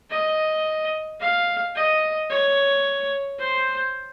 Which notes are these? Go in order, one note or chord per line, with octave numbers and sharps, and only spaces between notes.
D#5
F5
D#5
C#5
C5